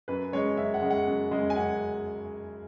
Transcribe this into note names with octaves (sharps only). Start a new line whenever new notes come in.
F#2 B4
C#3 G#3 C#5
F#2 E5
F#5
C#3 G#3
F#5
F#2
C#3 G#3
G#5
F#2 F#5